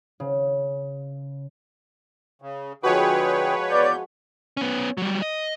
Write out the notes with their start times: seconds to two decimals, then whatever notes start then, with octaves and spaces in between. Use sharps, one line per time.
0.20 C#3
2.42 C#3
2.83 D3 F3 G#3 F#4 G#4 B4 C#5 G5
3.70 E2 D5 G6
4.57 B3 C#4
4.98 F#3 G3
5.22 D#5